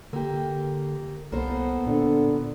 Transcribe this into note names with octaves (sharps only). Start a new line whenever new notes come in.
D3 A#3 G4
C2 A#3 B3 A4 C5
A#2 D3